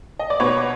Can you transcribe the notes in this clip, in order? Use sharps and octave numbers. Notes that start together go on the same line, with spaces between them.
D#5
D5
B2 B4 C#5